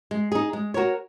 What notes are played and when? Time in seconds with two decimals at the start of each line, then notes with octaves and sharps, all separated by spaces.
0.11 G#3
0.32 D#4 G#4
0.53 G#3
0.74 F#4 A#4 C#5